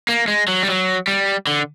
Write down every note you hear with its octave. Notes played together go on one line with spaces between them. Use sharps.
A#3
G#3
F#3
G3
F#3
G3
D3